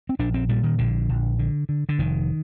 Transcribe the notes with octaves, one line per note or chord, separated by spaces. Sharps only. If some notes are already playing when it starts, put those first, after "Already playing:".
C4
A#1 D4
C4
A#2 G3
D#3
A#1 D3
A#1
D3
D3
D3
F1 D#3